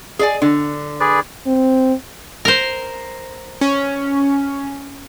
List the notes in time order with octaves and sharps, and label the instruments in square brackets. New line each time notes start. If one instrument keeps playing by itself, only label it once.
[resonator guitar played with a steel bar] G#4 D5 G#5
[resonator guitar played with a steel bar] D3 [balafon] D4
[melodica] G#4 B4 D5
[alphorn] C4
[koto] A#4 C5
[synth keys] C#4